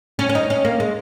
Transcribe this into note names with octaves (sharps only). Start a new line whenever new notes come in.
C#4
C#4
D#4
C#4
A#3
G#3